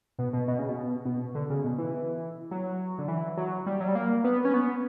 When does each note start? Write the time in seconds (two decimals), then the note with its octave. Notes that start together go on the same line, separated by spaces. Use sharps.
0.19 B2
0.33 B2
0.48 B2
0.59 C#3
0.69 B2
1.05 B2
1.35 D3
1.50 C#3
1.64 B2
1.78 E3
2.51 F#3
2.98 D3
3.08 E3
3.37 F#3
3.66 G3
3.81 F#3
3.88 G3
3.95 A#3
4.24 B3
4.45 C#4
4.54 B3